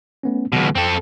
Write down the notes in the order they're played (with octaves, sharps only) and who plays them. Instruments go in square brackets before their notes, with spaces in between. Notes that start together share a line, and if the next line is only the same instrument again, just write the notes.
[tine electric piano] A3 B3 C#4
[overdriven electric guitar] C#2 B2 [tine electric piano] D#3 F#3
[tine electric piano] F2 G5 [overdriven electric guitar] C4 A4